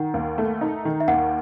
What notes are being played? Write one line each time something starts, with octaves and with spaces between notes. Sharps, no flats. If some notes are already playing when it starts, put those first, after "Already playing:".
Already playing: D#3 F#5
D#2
A3
D#4
D#3
E5
D#2 F#5